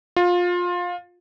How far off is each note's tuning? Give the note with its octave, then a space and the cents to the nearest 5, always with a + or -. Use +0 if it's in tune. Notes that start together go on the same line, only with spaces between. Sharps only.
F4 +20